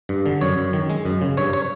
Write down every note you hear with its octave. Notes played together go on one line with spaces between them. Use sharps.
G2
D3
F#2 C#5
F#2
D#3
G#3
F#2
C#3
G2 C#5
C#5